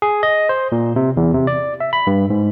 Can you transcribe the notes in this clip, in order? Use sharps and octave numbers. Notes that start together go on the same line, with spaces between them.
G#4
D#5
C5
A#2
C3
E2
C3
D5
E5
B5
G2
G#2